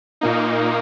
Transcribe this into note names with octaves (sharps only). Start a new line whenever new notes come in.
A#2 A#3 D#4